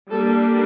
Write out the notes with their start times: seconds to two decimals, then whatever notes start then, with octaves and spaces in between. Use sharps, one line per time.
0.11 G3 A#3 D4 A4